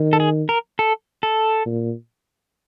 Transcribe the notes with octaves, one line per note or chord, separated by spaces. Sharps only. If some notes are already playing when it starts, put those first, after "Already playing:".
Already playing: D#3
A4
G#4
A#4
A4
A4
A#2